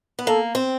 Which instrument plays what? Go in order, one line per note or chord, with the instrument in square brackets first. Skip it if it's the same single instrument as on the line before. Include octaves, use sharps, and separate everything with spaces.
[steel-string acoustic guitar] B3
[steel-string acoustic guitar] A#3 [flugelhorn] A4
[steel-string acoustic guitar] C4